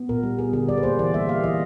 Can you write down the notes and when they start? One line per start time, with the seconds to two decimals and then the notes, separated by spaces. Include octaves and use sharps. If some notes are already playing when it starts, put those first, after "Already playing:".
Already playing: B3
0.09 A#2 A#4
0.23 G3
0.39 B3 G#4
0.53 D3 G#4
0.69 G3 D5
0.78 B4
0.83 A#3 C5
0.99 E3 D5
1.14 G3 E5
1.28 A#3 F5
1.44 E3 D#5